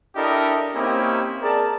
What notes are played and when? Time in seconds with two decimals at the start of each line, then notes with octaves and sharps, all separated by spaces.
0.16 D4 E4 G4 A4 A#4 D#5
0.74 A#3 C4 C#4 D#4 E4 G4
1.42 G#4 A#4 D5 A5